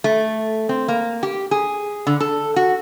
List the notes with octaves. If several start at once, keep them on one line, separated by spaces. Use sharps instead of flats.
A3
C4
A#3
G4
G#4
D3
A4
F#4